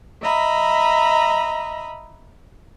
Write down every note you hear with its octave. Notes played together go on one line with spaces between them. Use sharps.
D#5 E5 A#5 B5